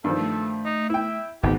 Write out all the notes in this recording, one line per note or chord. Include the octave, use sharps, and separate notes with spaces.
G2 D#3 F3 A4
A3
D#4
E4 E5 G5
G#1 D2 G#2 B2 G4